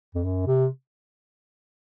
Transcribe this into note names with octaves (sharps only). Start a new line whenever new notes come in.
F2
F#2
C3